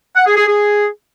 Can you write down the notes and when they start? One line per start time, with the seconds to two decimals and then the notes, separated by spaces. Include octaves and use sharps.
0.16 F#5
0.26 G#4
0.37 G#4
0.47 G#4